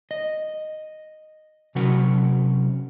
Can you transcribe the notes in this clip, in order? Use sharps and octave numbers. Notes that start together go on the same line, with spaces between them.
D#5
C3 F#3 C#4 F#4 A#4 F#5